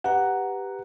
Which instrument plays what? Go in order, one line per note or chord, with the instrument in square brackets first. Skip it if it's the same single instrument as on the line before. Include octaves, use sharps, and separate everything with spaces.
[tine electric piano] G4 B4 A#5 [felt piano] F#5